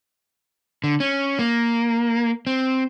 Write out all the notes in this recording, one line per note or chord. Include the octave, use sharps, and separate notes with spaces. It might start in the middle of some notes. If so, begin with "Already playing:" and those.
D3
C#4
A#3
C4